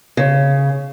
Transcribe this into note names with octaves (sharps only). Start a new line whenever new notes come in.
C#3